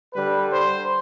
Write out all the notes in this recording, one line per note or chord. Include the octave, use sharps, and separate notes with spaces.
D3 G3 B4
C5